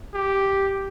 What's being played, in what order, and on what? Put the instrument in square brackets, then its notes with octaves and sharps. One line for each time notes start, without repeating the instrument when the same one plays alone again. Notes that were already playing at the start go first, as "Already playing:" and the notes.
[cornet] G4